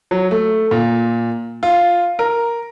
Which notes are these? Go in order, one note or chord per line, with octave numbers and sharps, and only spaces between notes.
F#3
A3
A#2
F4
A#4